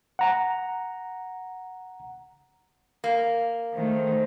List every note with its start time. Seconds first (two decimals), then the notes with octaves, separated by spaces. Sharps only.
0.19 F#5 A#5
3.04 A#3
3.74 D#3 A3 C5